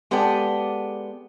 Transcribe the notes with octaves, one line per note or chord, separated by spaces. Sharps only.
G#3 B3 G4 A4 D5